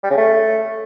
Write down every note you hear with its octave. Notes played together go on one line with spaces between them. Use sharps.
G3
C#3
A3